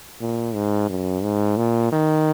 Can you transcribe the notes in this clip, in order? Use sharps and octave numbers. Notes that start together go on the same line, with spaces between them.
A#2
G#2
F#2
G#2
A#2
D#3